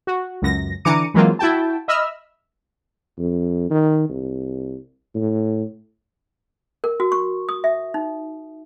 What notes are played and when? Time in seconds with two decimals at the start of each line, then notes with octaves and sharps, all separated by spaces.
0.07 F#4
0.42 C#2 F#2 A#6
0.85 D3 E3 A#5 D6 C#7 D#7
1.14 E3 F#3 G#3 A#3 C4 F4
1.39 E4 F#4 G5 A5
1.88 D#5 E5 B5 E6 F6
3.19 F2
3.70 D#3
4.09 C2
5.15 A2
6.84 A#4
7.00 F#4
7.12 C#6
7.49 D#6
7.64 E5
7.94 D#4